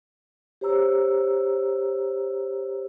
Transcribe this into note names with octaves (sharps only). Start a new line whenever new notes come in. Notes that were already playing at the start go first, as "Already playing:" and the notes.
G4 C5 C#5 A#5 E6